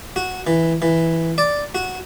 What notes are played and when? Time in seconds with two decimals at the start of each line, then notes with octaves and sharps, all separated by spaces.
0.16 F#4
0.47 E3
0.82 E3
1.38 D5
1.75 F#4